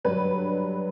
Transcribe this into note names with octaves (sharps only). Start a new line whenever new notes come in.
G2 D3 F#3 B4